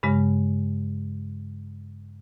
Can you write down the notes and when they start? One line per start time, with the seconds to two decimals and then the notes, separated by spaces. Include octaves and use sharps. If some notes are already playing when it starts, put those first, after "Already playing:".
0.03 G2 C#3 G#3